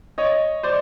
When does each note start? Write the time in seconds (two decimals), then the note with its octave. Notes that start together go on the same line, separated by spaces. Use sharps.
0.18 C#5 D#5
0.63 C5 D5